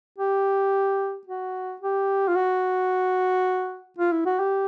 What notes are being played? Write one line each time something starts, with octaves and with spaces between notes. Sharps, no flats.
G4
F#4
G4
F4
F#4
F4
E4
F#4
G4